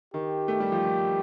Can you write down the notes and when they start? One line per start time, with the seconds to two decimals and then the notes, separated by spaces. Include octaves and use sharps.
0.14 D#3 G4
0.48 A3
0.60 G3
0.72 F3
0.85 D#3